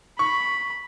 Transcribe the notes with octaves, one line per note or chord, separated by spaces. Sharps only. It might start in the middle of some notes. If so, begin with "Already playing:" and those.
B5 C#6